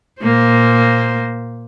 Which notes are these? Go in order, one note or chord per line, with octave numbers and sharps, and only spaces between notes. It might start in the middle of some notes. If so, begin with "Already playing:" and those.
A#2 A#3 C5